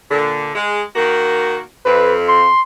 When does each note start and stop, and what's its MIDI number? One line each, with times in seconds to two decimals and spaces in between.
0.11 0.51 46
0.11 0.51 50
0.55 0.82 56
0.96 1.60 51
0.96 1.60 58
0.96 1.60 66
1.85 2.48 41
1.85 2.14 71
2.28 2.61 84